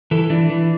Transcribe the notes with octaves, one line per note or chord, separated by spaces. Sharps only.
E3 A4
E3 D4
E3